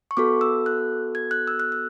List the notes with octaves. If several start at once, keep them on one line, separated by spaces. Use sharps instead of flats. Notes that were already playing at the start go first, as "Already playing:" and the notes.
C#6
B3 F#4 A4 D6
E6
F#6
G#6
F#6
E6
F#6
E6